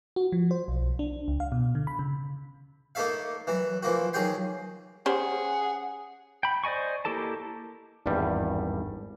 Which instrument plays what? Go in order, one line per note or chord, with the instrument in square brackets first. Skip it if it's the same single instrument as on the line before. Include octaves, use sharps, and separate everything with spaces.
[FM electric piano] F#4
F3
C5
B1
D4
C#2
F5
B2
D3
B5
C#3
[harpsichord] A#3 D#4 A4 C#5 E5 F5
E3 F#3
E3 F3 A#3 F#4
D#2 F#3 G#4 C#5 G5 C6
[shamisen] C#4 G4 C5 [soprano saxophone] G#4 [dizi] F#5
[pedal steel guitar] G5 B5
C5 D5 D#5 G#5 C#6
A#3 E4 G4 A4 A5
[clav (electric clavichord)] G#1 E2 G2 G3